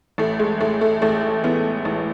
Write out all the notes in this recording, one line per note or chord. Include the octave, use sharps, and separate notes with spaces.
A1 A3
G#3
A1 A3
A3
A1 A3
E3 B3
A1